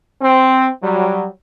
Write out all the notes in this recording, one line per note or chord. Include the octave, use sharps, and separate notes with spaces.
C4
F#3 G3